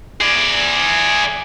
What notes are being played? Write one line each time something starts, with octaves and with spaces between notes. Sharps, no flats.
G#4 D5